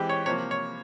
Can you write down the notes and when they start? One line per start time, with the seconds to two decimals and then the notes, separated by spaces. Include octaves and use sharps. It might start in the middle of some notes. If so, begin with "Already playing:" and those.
Already playing: E3 G#3 C4 G4
0.09 C#5
0.26 C3 F3 A#3 C#5
0.51 C#5